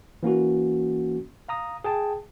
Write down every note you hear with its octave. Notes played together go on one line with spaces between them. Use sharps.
E3 A#3 C#4 F#4
F5 A#5 D#6
G#4 G5 A5